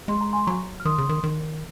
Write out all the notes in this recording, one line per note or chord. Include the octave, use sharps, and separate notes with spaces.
G#3 C6
A#5
G#5 C6
F#3 A#5 C#6
F6
D#3 C6 D#6
C#3
D#3
D#3